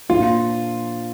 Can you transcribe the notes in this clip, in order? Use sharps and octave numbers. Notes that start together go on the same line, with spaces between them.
A#2 F3 D4 F4